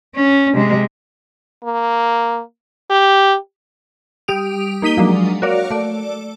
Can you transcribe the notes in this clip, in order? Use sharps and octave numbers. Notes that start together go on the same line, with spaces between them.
C#4
C3 G#3
A#3
G4
G3 G4 D#6 D7 F7
A#3 D#4 B6 D#7 G7
F3 F#3 G#3 A#3 D4
F#4 A#4 C#5 D5 F5
A3 D5